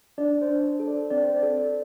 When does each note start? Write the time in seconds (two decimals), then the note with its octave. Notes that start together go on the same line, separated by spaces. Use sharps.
0.18 D4 D5
0.42 C5
0.49 D4
0.64 C5
0.80 A4
0.87 D5
1.11 C4 D5
1.24 C5
1.37 D5
1.42 A4